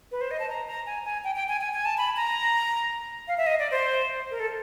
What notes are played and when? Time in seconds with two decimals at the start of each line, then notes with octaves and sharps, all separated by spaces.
0.12 B4
0.21 C5
0.31 D#5
0.40 A5
0.49 A#5
0.68 A#5
0.86 G#5
1.05 G#5
1.24 G5
1.35 G5
1.49 G#5
1.61 G#5
1.73 G#5
1.85 A5
1.98 B5
2.17 A#5
3.28 F5
3.38 E5
3.46 D#5
3.59 D5
3.71 C5
4.31 A#4
4.40 A4